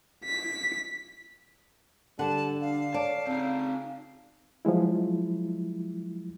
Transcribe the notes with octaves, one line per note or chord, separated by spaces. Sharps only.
B6
D3 G3 F#5 A5
D4 F5
C#5 D5 A5
C#3 C4 D#4
F3 F#3 G#3 E4